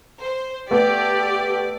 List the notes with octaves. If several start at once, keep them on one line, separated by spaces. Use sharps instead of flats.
C5
A3 B3 G4 D5